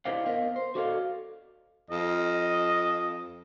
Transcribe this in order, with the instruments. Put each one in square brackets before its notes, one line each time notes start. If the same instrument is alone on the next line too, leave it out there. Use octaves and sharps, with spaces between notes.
[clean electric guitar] E4 G4 C5 D5 D#5 F5
B3 A#4 D#5 F5
C5
F#4 A4 D5 D#5 F5
[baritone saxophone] F2 [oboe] D#5